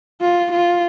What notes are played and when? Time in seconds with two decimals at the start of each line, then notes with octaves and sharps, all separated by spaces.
0.21 F4
0.51 F4